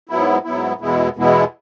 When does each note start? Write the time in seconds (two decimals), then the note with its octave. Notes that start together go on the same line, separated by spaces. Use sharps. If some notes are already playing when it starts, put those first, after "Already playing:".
0.09 G#2 F#3 B3 E4
0.44 G#2 F#3 B3 E4
0.80 E2 B2 G#3 B3 E4
1.16 E2 B2 G#3 B3 E4